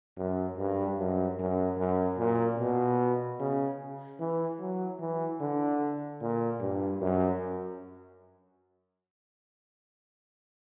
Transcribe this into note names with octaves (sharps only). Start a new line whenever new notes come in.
F#2
G2
F#2
F#2
F#2
A#2
B2
C#3
E3
F#3
E3
D3
A#2
G2
F#2